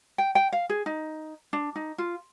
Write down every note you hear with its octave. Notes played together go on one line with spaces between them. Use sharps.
G5
G5
F5
G#4
D#4
D4
D#4
F4